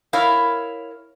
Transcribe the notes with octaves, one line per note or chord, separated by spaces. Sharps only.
E4 A#4 C#5 F5